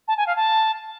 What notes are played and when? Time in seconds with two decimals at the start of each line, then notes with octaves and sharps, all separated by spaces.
0.08 A5
0.17 G#5
0.27 F5
0.36 A5